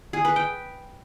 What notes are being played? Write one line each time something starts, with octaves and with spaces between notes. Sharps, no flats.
G#4
B4
G5